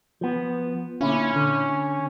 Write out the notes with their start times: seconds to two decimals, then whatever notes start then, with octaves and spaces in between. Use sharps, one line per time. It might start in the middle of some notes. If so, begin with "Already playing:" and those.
0.21 F3 B3
1.01 A#2 D3 C#4 E4
1.36 D3